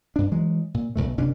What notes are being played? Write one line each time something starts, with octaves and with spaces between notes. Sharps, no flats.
G2 D4
E3 F#3 G#3
A#2
B1 E2 B2 A3
F#1 C3 C#4 D4